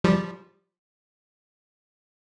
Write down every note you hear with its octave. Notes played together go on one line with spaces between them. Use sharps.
F3 G3